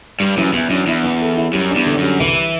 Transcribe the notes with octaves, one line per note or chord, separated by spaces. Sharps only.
G2 G3
F#2 E3
E2 E3
F#2 D4
E2 E4
E3
A4
E4
F#2 G3
D4
E2
D3
F#2 G3
C2 E3